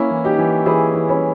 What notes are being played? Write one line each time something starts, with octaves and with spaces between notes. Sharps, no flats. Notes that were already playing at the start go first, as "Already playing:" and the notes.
Already playing: A#3 C#4 E4
E3
D#4 G4
E3
E3 E4 G#4
E3
C#4 E4